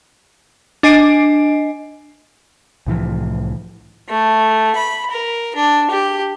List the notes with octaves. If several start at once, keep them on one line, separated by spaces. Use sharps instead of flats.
D4 D#5 G#5 C7 D7
C2 A2 E3 F3
A3
B5
A#4
D4
G4